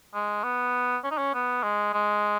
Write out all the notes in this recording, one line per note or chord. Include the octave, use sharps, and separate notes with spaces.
G#3
B3
C#4
D#4
C#4
B3
G#3
G#3